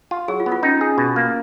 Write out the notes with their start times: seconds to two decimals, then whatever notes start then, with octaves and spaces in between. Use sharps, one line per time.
0.11 F4
0.28 F#3 G#4
0.40 F4
0.46 B3
0.52 F4
0.63 C#4 D#4
0.81 G#4
0.98 B2
1.16 A#3